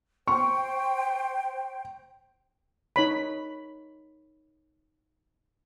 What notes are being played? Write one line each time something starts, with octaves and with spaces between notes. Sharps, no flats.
C5 G5 C#6
D#4 C#5 B5